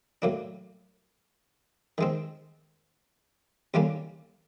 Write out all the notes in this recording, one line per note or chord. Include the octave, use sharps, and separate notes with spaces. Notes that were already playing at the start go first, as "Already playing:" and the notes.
A2 F#3 A#3 D4
D#3 G#3 C4
D#2 D3 G3 A#3 C#4